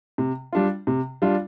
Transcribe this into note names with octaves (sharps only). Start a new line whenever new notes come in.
C3
G3 D4 F4
C3
G3 D4 F4